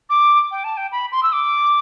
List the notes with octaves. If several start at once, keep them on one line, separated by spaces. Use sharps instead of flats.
D6
G5
A5
G5
B5
C6
E6
D6